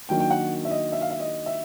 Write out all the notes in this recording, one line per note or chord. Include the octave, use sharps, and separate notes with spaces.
D#3 F#3 A#3 D4 G5
G5
F#5
E5
D#5
E5
F5
E5
D#5
E5